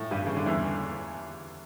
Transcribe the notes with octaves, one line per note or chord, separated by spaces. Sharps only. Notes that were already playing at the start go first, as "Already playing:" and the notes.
Already playing: A2 A3
G2 G3
C#3
D3
E2 E3